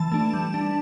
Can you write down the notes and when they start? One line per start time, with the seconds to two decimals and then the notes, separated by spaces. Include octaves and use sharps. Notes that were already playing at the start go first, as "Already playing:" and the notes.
Already playing: E3 A5
0.12 A3 D4
0.33 G3
0.54 D4